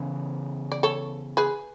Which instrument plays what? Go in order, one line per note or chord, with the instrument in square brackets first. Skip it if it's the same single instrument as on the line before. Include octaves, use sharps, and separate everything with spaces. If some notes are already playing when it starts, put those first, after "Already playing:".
Already playing: [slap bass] C#3 E3 B3
[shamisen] D5
A4 C#5
G#4 B4